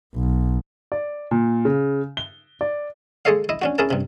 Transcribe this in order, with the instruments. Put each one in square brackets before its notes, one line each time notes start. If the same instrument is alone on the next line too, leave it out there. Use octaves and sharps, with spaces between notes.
[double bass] B1
[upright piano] D5
A#2
C#3
G7
D5
[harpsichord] G#3 G#4 A4 C#5 D#5 F5
E4 D#5
C#4 D4 F#4
C#4 E4 G#4 A#4 A5
G2 C3